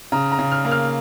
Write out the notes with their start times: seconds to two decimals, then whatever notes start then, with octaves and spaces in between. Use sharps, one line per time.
0.12 C#3 A#5
0.32 A#5
0.39 C#3
0.52 F6
0.65 A#3
0.71 F6